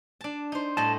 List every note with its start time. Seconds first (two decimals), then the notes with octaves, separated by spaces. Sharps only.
0.21 D4 A5
0.52 D#4 C5
0.77 A2 G3 D#5 A5